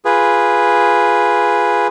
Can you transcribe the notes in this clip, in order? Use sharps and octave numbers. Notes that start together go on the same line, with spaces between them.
F4 G#4 B4